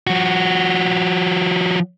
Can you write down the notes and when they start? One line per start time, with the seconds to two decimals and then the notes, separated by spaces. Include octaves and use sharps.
0.07 F3 F#4